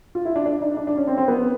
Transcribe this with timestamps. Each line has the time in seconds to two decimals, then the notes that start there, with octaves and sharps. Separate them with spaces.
0.15 F4
0.25 E4
0.36 D4
0.46 D4
0.61 D#4
0.77 D4
0.87 D4
0.97 C#4
1.07 C4
1.17 C4
1.28 B3